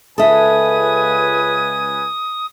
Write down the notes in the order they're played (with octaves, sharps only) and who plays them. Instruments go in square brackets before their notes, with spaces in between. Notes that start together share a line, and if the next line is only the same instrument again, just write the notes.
[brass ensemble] C#2 B4 G#5 [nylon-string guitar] A4 E5 [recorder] D#6